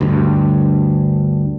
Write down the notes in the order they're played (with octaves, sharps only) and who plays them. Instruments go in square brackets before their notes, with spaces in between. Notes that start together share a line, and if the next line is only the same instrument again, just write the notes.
[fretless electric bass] D2 G2